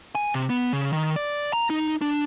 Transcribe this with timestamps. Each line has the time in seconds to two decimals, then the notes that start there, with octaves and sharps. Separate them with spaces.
0.15 G#5
0.34 C3
0.50 B3
0.73 C#3
0.93 D#3
1.16 D5
1.53 A#5
1.70 D#4
2.01 D4